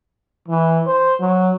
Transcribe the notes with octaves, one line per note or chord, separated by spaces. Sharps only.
E3
C5
F#3